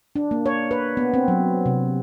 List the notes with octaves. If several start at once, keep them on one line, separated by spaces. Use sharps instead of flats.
D4
A#3
C#5
B4
B3
C4
F#3
C3